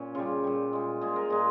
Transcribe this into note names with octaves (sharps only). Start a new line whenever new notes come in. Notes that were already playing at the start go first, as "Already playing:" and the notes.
Already playing: A#2 C#4
C#3 G3 F4
A#2 G3
A#2 G#3
A#2 G#3 G#4
A#4
A#2 G#3 G#4